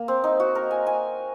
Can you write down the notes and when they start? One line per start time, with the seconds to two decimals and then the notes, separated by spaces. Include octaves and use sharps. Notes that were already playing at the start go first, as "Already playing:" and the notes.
Already playing: A#3
0.08 C4
0.24 D#4
0.40 F#4
0.55 A#4
0.71 G#5
0.87 G#5